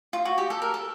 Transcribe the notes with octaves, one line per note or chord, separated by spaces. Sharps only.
F4
F#4
G4
A4
A#4
A4